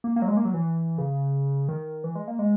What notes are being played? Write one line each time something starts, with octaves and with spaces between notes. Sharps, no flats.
A#3
A#3
F#3
G#3
A#3
F#3
E3
C#3
D#3
E3
G#3
A#3
G#3